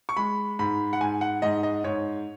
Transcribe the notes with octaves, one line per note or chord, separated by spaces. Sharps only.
C#6
G#3 B5
G#2 B5
F#5
G#2 G#5
F#5
G#2 D#5
D#5
G#2 C#5